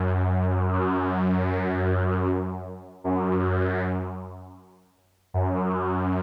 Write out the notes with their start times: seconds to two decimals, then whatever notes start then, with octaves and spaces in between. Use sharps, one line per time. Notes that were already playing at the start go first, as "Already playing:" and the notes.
Already playing: F#2
0.73 F#2
3.04 F#2
5.34 F#2